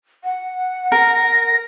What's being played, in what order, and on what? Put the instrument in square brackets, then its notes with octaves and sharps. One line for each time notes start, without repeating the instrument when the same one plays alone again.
[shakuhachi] F#5
[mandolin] A#4 [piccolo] A#6